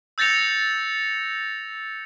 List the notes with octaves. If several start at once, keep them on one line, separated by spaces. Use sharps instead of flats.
E6 G6 A6 A#6 C#7 F7